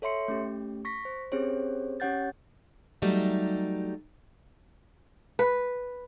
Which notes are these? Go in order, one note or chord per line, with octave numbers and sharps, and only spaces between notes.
A4 C#5 E5 C6 C#7
A3 C#4 G4
C#6 A#6 B6
C5
C4 C#4 G4 G#4 C5 C#5
C#4 G4 C#5 F#5 G6 A6
F#3 G3 A3 D#4 G4 E5
B4